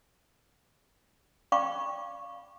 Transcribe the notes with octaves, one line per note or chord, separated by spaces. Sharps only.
D5 F5 G5 B5 C#6 D6